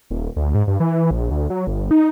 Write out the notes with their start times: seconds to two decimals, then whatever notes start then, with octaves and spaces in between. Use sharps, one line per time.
0.10 D#1
0.36 D2
0.55 G#2
0.67 G2
0.80 E3
1.11 A#1
1.31 D2
1.50 F#3
1.67 G1
1.91 D#4